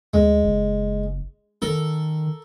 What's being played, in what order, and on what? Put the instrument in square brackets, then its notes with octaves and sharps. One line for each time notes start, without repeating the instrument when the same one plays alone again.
[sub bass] D2 [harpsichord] G#3
[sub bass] F#1
[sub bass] D#3 [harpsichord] A4 A#4